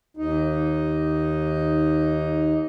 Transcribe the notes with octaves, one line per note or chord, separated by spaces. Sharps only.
D#2 D#4